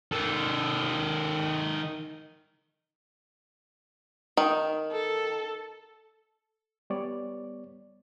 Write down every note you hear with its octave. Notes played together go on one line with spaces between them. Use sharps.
D#3 A4
D#3
A4
G3 B3 C#5 D5